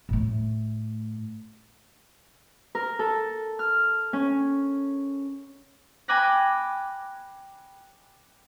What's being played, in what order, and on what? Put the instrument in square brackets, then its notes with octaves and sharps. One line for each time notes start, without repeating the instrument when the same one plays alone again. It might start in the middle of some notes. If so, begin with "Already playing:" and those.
[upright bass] A2 A3
[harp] A#4
A4
F6
C#4
G5 G#5 B5 D6 F#6 A#6